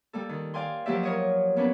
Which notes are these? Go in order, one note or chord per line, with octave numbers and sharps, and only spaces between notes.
G3 A#3 A4
D#3
D5 F5 G5 G#5 C6
F3 F#3 A#3 G4 D5 E5
A#4 C#5 D#5
A#3 B3 C#4 D4 B4